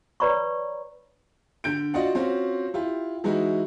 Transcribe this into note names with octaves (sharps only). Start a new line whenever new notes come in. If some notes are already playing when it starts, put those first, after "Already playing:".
B4 C#5 D5 A#5 B5 C#6
D3 G6 D7
F4 F#4 D5 D#5 F5 F#5
C4 C#4 F4 F#4
E4 F4 G4
E3 G#3 D#4 E4 F#4